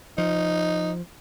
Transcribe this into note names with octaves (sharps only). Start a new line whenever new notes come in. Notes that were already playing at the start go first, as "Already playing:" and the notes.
F3 D#4